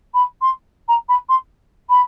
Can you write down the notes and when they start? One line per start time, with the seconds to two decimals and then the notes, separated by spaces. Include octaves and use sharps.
0.14 B5
0.41 C6
0.88 A#5
1.08 B5
1.29 C6
1.89 B5